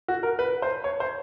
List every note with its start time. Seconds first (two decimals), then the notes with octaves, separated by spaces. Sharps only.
0.08 F#4
0.23 A#4
0.39 B4
0.62 C5
0.84 C#5
1.00 C5